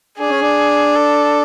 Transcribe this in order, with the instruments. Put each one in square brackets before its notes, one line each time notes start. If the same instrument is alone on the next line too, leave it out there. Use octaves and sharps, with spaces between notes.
[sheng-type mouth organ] D4 [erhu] G#4
[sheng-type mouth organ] C#4
D4
[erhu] A4